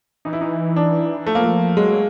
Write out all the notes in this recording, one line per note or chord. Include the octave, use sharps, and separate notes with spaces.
E3 D#4
E4
D#4
D4
F3 A3
A#3
A3
F#3 G#3